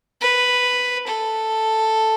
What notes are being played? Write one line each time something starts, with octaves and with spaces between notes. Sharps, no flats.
B4
A4